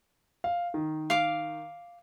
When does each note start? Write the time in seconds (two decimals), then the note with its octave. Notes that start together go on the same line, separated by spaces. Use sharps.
0.44 F5
0.74 D#3
1.10 F5 D6